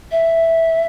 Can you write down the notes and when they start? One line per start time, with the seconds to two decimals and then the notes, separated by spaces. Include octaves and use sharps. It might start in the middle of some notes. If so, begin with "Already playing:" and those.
0.11 E5